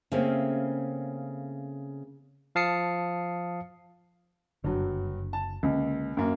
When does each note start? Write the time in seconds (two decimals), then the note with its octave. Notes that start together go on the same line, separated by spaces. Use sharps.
0.12 C#3 A3 A#3 C4 C#4
2.55 F3 F5 A5 D#6 C7 C#7
4.64 F#1 G2 D3 F#3
5.33 A5
5.63 C#2 D3 G#3 A#3
6.17 F#2 A#3